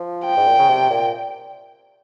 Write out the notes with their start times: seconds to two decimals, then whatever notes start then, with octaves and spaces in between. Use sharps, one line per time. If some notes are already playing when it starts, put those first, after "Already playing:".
Already playing: F3
0.26 G5
0.37 G#2
0.47 A#2
0.58 C#3
0.69 C3
0.90 A#2